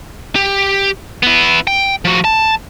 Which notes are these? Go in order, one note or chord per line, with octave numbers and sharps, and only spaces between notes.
G4
B3 E4
G5
F3 F#4
A5